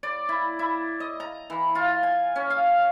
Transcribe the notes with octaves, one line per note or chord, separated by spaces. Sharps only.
D5
E4
E4
D#5
A#5
E3
F4
G#5
C#4
F5